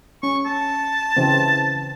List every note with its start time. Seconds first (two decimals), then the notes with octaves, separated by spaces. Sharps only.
0.23 C#4 C#6
0.46 A5
1.17 C#3 E3 C4